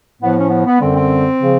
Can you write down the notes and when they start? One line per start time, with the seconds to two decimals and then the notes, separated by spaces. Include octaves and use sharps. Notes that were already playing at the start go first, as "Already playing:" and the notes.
0.21 A2 F3 B3
0.36 C#4
0.50 B3
0.65 B3
0.79 F#2 D3 G3 C4
0.95 C4
1.41 C#3 F3